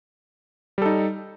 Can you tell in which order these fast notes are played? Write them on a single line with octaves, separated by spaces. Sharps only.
G3 A4 D#4